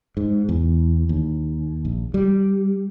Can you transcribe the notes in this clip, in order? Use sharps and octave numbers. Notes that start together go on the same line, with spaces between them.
G#2
E2
D#2
A#1
G3